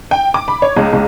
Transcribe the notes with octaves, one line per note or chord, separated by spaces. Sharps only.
G5
D6
B5
C#5
C#2
C#2